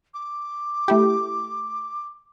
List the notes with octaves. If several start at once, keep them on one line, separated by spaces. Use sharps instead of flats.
D6
A3 E4 G4